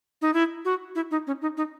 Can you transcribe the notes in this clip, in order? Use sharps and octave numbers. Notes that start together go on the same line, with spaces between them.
D#4
E4
F#4
E4
D#4
C#4
D#4
D#4